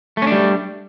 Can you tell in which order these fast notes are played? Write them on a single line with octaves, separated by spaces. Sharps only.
A3 C#4 D4 G3